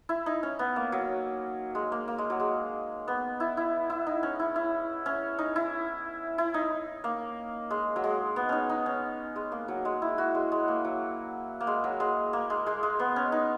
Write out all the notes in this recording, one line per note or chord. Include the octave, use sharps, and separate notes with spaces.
E4
D#4
C#4
B3
A#3
F#3
G#3
A#3
A#3
G#3
F#3
G#3
B3
E4
E4
E4
D#4
C#4
E4
E4
C#4
D#4
E4
E4
D#4
A#3
G#3
F#3
G#3
B3
C#4 D#4
D#4
C#4
G#3
A#3
F#3
G#3
E4
F#4
G#3
G#3
A#3
F#3
A#3
G#3
F#3
G#3
A#3
G#3
G#3
G#3
B3
C#4
D#4